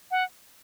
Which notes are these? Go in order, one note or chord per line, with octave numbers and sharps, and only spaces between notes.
F#5